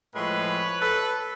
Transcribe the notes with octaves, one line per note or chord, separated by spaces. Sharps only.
A2 F3 G#3 B4 C#5
A4 B4